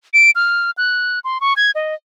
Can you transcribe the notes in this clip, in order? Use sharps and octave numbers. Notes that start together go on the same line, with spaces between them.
D7
F6
F#6
C6
C#6
G#6
D#5